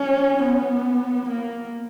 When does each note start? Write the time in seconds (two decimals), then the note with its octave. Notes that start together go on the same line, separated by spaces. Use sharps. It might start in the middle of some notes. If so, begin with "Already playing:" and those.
Already playing: C#4
0.44 B3
1.29 A#3